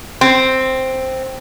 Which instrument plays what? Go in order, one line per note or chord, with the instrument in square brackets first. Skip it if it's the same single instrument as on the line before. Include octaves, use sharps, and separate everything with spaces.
[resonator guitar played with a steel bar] C4